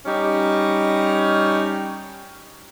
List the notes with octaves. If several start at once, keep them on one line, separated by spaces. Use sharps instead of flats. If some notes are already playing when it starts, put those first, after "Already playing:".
G3 C#4 D#4